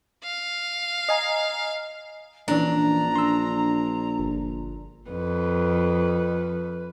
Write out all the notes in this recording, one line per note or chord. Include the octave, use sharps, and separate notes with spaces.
F5
D#5 G#5 A#5
A#1 E3 C#4 D4 A#5
C6 E6
G1
F2 B4